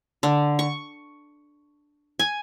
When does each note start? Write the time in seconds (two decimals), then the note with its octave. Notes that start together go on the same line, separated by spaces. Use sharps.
0.23 D3
0.59 C#6
2.19 G#5